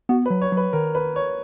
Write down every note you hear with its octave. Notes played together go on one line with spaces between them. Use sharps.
B3 F#4
B4
F#3
C#5
F#3 B4
D#3 A#4
B4
C#5